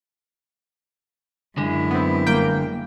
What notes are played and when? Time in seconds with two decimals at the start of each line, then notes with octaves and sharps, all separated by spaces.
1.58 F#2 D3 G#3 E4
1.91 B3 C4
2.27 G1 A#3 G5